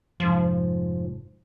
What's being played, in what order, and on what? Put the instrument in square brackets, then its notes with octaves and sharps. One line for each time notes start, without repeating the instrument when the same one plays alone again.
[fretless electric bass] F1 G#2 [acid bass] F3